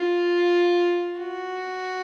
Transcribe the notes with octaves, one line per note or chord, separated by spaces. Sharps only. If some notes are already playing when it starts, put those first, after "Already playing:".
Already playing: F4
F#4